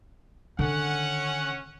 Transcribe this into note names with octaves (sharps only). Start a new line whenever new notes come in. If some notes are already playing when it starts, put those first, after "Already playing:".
D3 D#3 C#4 F#5